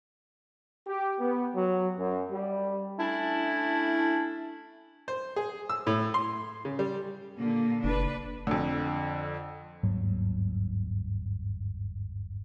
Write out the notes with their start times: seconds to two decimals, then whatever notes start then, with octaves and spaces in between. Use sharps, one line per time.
0.87 G4
1.20 B3
1.55 F#3
1.98 F#2
2.30 G3
2.99 A3 C#4 D4 E4
5.08 C5
5.36 G#4
5.69 E6
5.87 A2
6.14 C6
6.65 C#3
6.79 G3
7.37 A#2 D3 A#3
7.84 F#1 D4 B4
8.47 F2 D3
9.83 G1 D#2 G#2 F#3